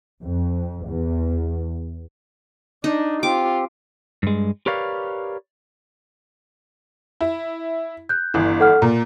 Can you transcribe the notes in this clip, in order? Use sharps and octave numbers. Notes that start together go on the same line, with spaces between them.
F2
E2
D4 D#4
C4 F4 G4 D6
G2 G#3
G4 A#4 B4 C#5 D5 F5
E4
F#6 G6
G1 E3
A4 F#5 F6
A#2 A#5